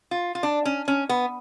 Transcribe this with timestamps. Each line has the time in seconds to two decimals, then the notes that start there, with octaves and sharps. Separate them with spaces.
0.11 F4
0.35 F4
0.43 D4
0.65 C#4
0.88 C#4
1.09 B3